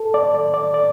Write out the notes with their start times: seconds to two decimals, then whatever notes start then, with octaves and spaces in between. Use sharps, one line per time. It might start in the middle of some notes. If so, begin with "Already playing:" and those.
Already playing: A4
0.14 D5
0.35 D5
0.54 D5
0.74 D5